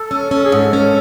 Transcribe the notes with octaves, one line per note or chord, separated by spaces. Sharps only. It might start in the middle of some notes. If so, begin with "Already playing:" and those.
Already playing: A4
C#4
C#4 A4
G#4
G#2 A4
C#4 A4 A#4